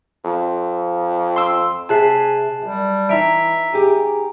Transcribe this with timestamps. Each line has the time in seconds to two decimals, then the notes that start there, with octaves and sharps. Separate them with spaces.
0.25 F2
1.36 C6 E6
1.89 C3 G#4 E5 G#5 A5 F#6 C7
2.62 F#2 G3
3.09 E3 D#4 E5 A#5 D7
3.73 G4 G#4 G#5